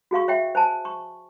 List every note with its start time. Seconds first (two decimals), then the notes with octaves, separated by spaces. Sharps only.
0.11 F#4 G#4 F5 C#6
0.28 C#5 E5 G5
0.55 C5 G#5 A5
0.85 C#6